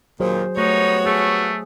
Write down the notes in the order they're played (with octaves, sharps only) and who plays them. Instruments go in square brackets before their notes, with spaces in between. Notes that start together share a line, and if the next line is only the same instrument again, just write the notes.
[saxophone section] D#2 A#2 D#3 [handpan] F#3 G#4 C5
[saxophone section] G3 B3 F#4 [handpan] A3 [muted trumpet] D#4 [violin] C#5
[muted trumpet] A3 [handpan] G#4